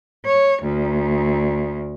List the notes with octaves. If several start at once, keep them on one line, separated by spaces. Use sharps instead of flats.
C#5
D2